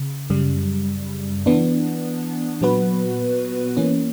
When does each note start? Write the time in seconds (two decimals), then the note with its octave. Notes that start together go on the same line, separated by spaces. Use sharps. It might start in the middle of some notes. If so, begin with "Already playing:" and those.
Already playing: C#3
0.30 F#2 C#3 G3
1.46 E3 B3 D4
2.61 A#2 F#3 B3 F#4 B4
3.77 E3 A#3 C#4